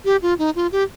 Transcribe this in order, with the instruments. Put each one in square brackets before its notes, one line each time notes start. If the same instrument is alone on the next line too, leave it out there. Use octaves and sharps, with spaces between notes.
[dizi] G4
F4
D#4
F4
G4